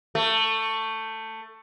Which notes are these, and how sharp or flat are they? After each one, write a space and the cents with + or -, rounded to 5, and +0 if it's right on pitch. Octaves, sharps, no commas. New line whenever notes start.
A3 +15